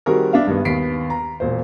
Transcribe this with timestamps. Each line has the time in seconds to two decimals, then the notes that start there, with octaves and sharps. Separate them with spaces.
0.06 D#3 G3 C4 F#4 G#4 A#4
0.33 B3 D4 E5 F5
0.47 G2 D#3 B3
0.65 D#2 B3 B6 C7 D7
1.10 A#5
1.40 E1 A#2 C5